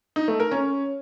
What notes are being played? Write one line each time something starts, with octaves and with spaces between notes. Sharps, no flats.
D#4
A3
A#4
C#4